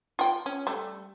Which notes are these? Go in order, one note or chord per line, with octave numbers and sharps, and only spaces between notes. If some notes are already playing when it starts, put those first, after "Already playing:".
F4 G5
C#4
G3 A3